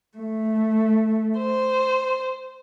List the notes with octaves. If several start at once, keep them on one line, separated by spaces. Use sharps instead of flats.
A3
C5